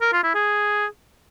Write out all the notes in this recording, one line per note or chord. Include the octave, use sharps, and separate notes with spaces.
A#4
F4
E4
G#4